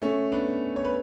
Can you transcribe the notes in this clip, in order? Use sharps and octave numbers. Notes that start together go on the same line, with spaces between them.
A3 C#4
B3 D4
C#5
B4